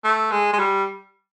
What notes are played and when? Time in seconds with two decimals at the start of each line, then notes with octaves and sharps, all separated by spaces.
0.04 A3
0.31 G#3
0.53 G#3
0.59 G3